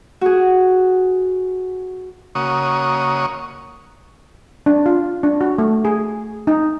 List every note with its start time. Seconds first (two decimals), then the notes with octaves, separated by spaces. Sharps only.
0.21 F#4 G#4
2.35 C#3 A#3 F#4 C#6 D#6
4.66 D4
4.86 F4
5.23 D4
5.41 F#4
5.58 A3
5.85 G#4
6.47 D#4